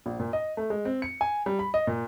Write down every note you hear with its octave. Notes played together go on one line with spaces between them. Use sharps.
A#1
A#2
D#5
A3
G#3
C4
C#7
G#5
G3
B5
D#5
A#2